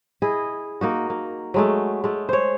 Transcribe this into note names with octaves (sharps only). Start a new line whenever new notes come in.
E4 G#4 D#5
A#3 D#4 F#4
A#3
F#3 G#3 A3
G#3 A3
C5 C#5